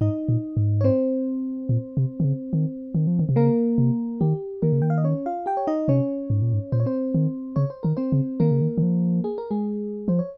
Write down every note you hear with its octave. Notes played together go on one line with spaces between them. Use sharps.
G#2 D#4 D#5
A#2
G#2
C#5
C4 C5
A#2
C3
D#3
C#3
D#3
D#3
F3
D#3
C3
C#3 A#3 A#4
C3
D#3 G4
D#3 A#3 A#4
C#3
D#3 G5
F5
D#5
C#4 C#5
F4 F5
G4 G5
C#5
D#4 D#5
C3 C#4 C#5
G#2
A#2
G#2
A#2 C5
C#5
C4 C5
D#3
C#3 C#5
C5
D#3 A#4
C4 C5
C#3
D#3 A#3 A#4
C#3
D#3
D#3
F3
G#4
A#4
G#3 G#4
F3 C5
C#5